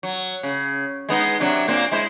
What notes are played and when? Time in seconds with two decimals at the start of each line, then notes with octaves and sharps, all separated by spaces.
0.03 F#3
0.43 C#3
1.09 G#3 B3 D#4
1.40 C3 F#3 D4
1.68 A#2 A#3 C4
1.92 G#3 E4 C5